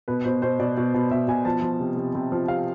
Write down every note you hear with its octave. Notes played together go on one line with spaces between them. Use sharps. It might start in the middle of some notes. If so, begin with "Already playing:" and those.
B2 B4
B2 C5
B2 C5
B2 D5
B2
B2
B2 E5
B2 G#5
F3 A5
F3
C3
C3
C3
F3
C3 F5